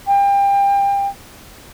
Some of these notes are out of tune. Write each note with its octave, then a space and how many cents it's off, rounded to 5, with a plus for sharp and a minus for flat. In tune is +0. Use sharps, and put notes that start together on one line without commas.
G5 +30